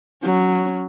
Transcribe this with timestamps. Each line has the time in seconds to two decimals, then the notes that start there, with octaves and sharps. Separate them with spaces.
0.22 F#3 C#4